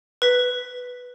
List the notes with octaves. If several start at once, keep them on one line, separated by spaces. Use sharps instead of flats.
B4 B6